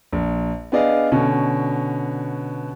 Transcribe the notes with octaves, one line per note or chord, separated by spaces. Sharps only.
A#1
B3 D4 G#4 D5 D#5 F5
B2 D3 C#4